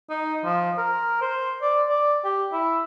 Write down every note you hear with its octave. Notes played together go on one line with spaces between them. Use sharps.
D#4
F3
A#4
C5
D5
D5
G4
E4